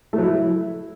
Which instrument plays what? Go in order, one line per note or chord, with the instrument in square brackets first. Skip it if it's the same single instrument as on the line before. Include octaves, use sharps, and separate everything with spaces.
[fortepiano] A3
F#3
E4